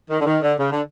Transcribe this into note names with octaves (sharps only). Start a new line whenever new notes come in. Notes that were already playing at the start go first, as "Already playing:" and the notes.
D#3
D3
D#3
D3
C#3
D3